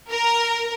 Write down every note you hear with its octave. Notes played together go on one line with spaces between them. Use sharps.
A#4